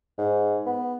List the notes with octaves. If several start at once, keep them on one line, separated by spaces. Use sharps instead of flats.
G#2
B3